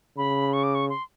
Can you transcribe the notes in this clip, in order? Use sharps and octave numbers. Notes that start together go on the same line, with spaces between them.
C#3 B5
C#6
D6
C#6
C6